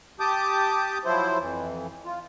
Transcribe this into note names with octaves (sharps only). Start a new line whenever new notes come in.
G4 A5 D6 D#6 G6
F3 F#3 E4 C5
F2 E3
F4